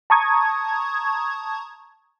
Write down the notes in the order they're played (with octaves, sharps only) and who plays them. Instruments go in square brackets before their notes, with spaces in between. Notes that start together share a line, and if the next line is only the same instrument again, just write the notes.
[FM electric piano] A5 A#5 C#6 D#6 G#6